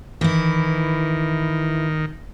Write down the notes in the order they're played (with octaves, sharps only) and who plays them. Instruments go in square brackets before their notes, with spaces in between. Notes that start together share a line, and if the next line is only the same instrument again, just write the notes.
[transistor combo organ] D#3 [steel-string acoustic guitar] E3 E4